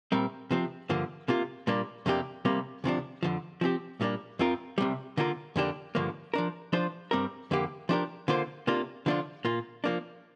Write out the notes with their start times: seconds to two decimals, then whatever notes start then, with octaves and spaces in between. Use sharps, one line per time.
0.12 C2 A#2 G3 C4 A#4
0.51 C3 F3 C4
0.89 G2 D3 F3 A#3
1.28 C3 A#3 F4
1.67 A#2 G3 A#3 D4
2.06 F2 C3 A#3 D4 G4
2.45 C3 G3 A#3
2.84 D2 C3 F3 D4
3.23 F2 D3 F3
3.61 F3 C4 G4
4.01 A#2 G3 A#3 D4
4.39 F2 F3 C4 F4 A#4
4.78 C2 C3 G3
5.17 D3 A#3 F4 A#4
5.56 F2 D3 A#3 D4 G4
5.95 G2 D3 F3 A#3
6.34 F3 D4 A#4
6.73 F3 D4 F4 C5
7.11 G2 G3 C4 A#4
7.51 F2 D3 A#3 G4
7.89 F3 D4 G4 A#4
8.28 D3 A#3 F4 C5
8.67 C3 A#3 D4 F4
9.06 D3 F3 D4 F4
9.45 A#2 A#3 F4
9.84 F3 A#3 D4